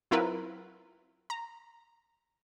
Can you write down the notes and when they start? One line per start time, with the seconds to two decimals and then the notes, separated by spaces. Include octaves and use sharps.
0.11 F#3 C4 E4 F4 A#4 B4
1.30 A#5